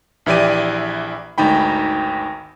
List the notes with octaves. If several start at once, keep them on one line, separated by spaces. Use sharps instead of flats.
A#1 E3 E4 G4 D5 D#7
G#1 D2 D#4 G5 B5